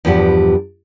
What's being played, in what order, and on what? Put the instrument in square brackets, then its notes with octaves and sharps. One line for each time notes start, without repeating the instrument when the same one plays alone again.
[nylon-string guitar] E2 G2 B2 F3 G4 F#5